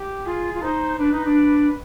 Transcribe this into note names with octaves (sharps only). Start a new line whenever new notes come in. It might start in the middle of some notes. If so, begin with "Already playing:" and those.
Already playing: G4
F4 G#4
F4
D#4 C5
D4 B4
D#4
D4